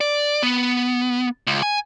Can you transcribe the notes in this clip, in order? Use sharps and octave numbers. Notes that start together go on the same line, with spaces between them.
D5
B3
C#2
G#5